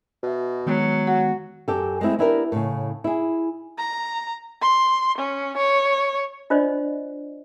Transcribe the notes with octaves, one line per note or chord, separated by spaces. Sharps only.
B2 F#4 E5
D#3 F#3 G#3 B3
F#4 F#5
F#2 G4 A4
G#3 A3 C4 E4
B3 D4 E4 G4 A4 A#4
A2 C#3
E4 G#4
A#5
C6
C#4
C#5
D4 F4 C5 D5 D#5